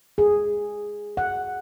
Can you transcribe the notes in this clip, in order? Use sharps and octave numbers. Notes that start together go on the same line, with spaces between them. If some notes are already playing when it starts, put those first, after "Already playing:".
G#4
F#5